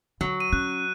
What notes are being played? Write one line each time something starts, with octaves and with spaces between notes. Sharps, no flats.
D3 F#3
D#7
C#4 F#6